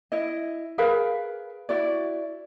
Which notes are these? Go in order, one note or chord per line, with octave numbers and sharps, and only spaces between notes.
E4 D#5
G#4 A#4 B4 F5
E4 F#4 D5